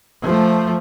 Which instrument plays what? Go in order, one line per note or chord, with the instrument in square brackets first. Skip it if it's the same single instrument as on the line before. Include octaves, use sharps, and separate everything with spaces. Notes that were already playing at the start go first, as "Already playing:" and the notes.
[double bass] F3 A3